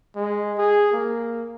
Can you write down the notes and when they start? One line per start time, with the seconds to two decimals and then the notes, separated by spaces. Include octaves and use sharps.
0.16 G#3
0.58 G#4
0.93 A#3